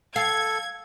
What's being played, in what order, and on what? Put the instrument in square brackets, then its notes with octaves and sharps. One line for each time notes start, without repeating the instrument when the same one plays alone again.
[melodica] A4 [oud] F5 [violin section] G#6